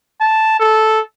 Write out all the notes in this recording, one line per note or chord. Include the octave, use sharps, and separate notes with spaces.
A5
A4